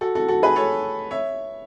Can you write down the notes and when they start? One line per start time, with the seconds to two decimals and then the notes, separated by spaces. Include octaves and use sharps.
0.01 F#4 A4
0.15 F#4 A4
0.28 F#4 A4
0.43 G#4 B4
0.56 A4 C#5
1.11 C#5 E5